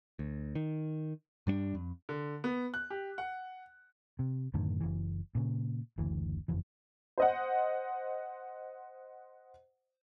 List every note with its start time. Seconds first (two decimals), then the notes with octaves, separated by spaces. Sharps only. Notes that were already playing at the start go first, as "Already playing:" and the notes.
0.19 D2
0.55 D#3
1.47 G2 G3 C4 D4
1.75 F2
2.09 D3
2.44 B3
2.74 F#6
2.90 G4
3.18 F#5
4.19 C3
4.54 F#2 A2 D3 D#3
4.81 F#1 E3
5.35 A#2 C#3
5.98 F#1 D2 E3
6.48 F#1 F2 E3
7.18 C5 D#5 F#5